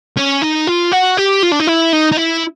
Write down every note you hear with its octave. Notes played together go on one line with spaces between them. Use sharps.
C#4
D#4
F4
F#4
G4
F4
D4
D#4
E4
D#4
D#4
E4